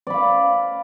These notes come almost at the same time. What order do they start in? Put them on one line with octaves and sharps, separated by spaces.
D5 B5 F5